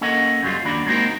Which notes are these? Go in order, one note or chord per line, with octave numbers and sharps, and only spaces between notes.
A#3 C#4 A4 A#4 D#5 F#5
F#2 F#3 G3 F4
D#2 A#3 D4 F#4 D5 B5
G#3 A#3 C4 D#4 F#4 A#4